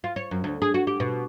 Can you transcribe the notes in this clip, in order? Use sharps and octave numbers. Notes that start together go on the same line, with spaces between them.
F4
C#5
F#2
D2
G#4
F#4
G4
B2